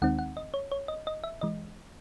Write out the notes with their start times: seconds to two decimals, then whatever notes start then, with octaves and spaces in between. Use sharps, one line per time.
0.02 D#2 D#3 G#3 C4 D#4 F#5
0.19 F#5
0.37 D#5
0.54 C#5
0.72 C#5
0.88 D#5
1.07 D#5
1.24 E5
1.41 E3 G#3 D#5